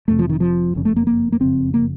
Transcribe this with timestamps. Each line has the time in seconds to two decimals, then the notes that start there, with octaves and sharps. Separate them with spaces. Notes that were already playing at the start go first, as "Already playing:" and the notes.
0.08 F1 F2 C3 A3
0.19 F3
0.29 D#3
0.40 F3
0.74 F#1 F2 C#3
0.85 A3
0.96 A#3
1.07 A#3
1.32 A#3
1.40 F#1 F2 C#3 C4
1.74 A#3